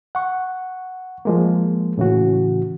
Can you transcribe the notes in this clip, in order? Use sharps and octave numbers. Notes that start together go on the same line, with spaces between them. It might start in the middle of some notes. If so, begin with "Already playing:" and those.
F#5 C#6
F3 G#3 A#3
A2 C#3 E3 F#4